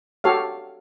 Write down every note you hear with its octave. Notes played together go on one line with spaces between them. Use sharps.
F#4 G4 A4 C#5 F5